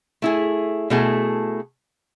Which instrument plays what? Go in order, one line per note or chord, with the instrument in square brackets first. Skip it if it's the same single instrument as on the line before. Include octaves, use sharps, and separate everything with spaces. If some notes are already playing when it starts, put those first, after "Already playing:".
[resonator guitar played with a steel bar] A3 E4 G#4
B2 A3 E4 G#4